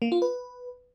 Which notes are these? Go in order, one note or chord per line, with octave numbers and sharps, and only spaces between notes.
A#3
F4
B4